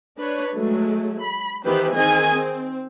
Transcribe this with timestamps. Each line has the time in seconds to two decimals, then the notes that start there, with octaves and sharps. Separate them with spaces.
0.19 D4 B4 C#5
0.54 F#3 G#3 A3
1.22 B5
1.65 D#3 E3 B3 G4 B4 C5
1.95 D#3 C4 G#4 D#5 G#5
2.34 C4